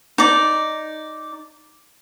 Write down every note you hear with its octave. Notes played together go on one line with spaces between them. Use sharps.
D#4 D5